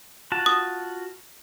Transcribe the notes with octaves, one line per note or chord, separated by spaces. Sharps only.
F4 F#4 A5
D#6